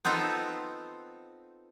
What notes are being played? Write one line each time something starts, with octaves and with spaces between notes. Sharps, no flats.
B3 C4 D#4 F4 A4